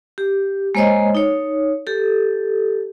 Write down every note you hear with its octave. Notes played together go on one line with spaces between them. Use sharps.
G4
G#3 A#3 C5 C#5 D#5
D#4 C#5
G4 A4